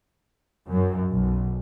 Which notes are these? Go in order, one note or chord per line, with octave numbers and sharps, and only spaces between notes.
F#2
B1